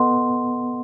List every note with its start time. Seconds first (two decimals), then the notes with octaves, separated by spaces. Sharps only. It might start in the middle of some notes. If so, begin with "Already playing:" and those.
Already playing: B3 A4 D#5 F#5 C6